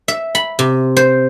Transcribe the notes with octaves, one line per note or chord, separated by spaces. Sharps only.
E5
B5
C3
C5